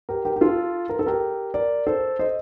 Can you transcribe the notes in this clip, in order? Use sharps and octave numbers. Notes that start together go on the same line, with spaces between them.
G4 A#4
G4 A#4
G4
F4 A4
A#4
A4
G4 A#4
A#4 D5
A4 C5
C5 D#5